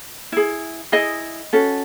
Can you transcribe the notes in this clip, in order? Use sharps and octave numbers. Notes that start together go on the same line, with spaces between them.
E4 G#4
E4 G#4 D#5
C#4 F#4 A4